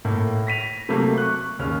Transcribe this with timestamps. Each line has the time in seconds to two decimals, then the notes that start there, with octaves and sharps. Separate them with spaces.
0.05 A2 A#3
0.47 A#6 B6 D#7 F7
0.89 C3 F#3 A3 A#3
1.18 C#6 F#6
1.59 D#2 C#3 C#4 F6